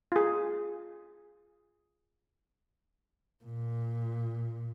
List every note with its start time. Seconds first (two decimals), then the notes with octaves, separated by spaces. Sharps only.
0.12 F4 G#4
3.44 A#2